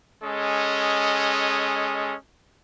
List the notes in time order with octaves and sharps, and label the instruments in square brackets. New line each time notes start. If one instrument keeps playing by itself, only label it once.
[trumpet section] G#3 C#4 A4 D#5